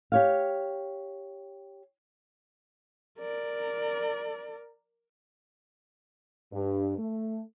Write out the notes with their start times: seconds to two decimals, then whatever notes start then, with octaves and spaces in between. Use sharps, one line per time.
0.12 G4 C#5 F5
3.19 A#4 D5
6.52 G2
6.98 A3